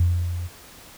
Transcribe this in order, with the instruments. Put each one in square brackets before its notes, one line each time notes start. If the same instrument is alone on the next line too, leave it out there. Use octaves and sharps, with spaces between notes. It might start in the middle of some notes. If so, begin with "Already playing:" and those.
Already playing: [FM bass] F2